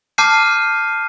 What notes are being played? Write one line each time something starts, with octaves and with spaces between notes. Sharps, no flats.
A5 D6 F6 G6 C7 D#7